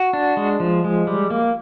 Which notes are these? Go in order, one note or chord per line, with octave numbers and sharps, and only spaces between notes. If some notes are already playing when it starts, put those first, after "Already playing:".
Already playing: F#4
D4
G#3
F3
G#3
G3
A#3